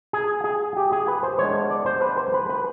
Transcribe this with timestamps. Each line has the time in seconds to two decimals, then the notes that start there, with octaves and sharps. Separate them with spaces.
0.13 G#4
0.44 G#4
0.77 G4
0.92 G#4
1.08 B4
1.23 C5
1.39 E3 G#3 B3 D4 C#5
1.70 D5
1.86 C5
2.02 B4
2.18 C5
2.34 B4
2.49 B4